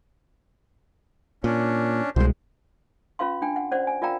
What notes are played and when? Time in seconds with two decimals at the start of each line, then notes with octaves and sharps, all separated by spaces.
1.44 A#2 C#4 D4
2.16 C2 B2 G#3 C5
3.19 C#4 F4 B4 F5 C6
3.42 D4 G5 G#5
3.56 F#5
3.71 C#4 C5 D5 F#5
3.87 G#5
4.02 F4 A#4 D5 F5 G5 A#5